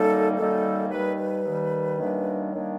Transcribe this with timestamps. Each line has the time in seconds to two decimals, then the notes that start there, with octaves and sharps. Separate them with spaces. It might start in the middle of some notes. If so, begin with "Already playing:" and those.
Already playing: F#2 D#3 G3 A#3 D#4 A4
0.37 F#2 D#3 G3 A#3 D#4 A4
0.90 D#2 D#3 G3 B4
1.17 B4
1.45 D#2 D#3 G3
1.99 F#2 D#3 G3 A#3 D4
2.52 D#3 G3 A#3 D4 C#5